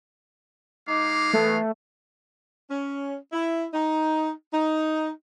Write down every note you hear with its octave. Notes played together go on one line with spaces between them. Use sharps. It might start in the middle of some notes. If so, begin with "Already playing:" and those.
G#3 D#4 F5 D6
E3 A3 B3
C#4
E4
D#4
D#4